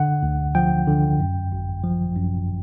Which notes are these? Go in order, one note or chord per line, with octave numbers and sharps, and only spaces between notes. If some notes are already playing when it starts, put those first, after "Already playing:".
Already playing: D3 F#5
D2
F3 G5
D3
F#2
G#1
F3
F#2